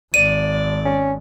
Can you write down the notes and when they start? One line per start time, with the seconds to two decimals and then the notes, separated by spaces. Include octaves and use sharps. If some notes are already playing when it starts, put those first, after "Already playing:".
0.14 G#1 D5 D#7
0.85 C#4